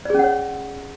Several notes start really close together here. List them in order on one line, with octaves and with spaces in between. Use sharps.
D5 G#4 C#4 F#5 C#5